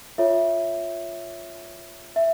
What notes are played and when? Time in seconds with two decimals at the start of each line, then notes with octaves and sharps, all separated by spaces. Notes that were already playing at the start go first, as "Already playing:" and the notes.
0.18 F4 A4 C#5 E5
2.16 E5